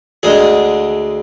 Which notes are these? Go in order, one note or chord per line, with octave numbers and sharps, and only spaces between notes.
D2 D3 G#3 G#4